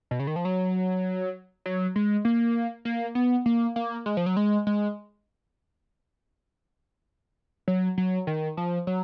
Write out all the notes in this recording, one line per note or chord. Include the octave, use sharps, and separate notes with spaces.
B2
C#3
D#3
F3
F#3
F#3
G#3
A#3
A#3
B3
A#3
A#3
G#3
F3
F#3
G#3
G#3
F#3
F#3
D#3
F3
F#3